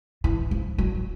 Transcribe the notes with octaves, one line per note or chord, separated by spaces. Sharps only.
E3
F3
F#3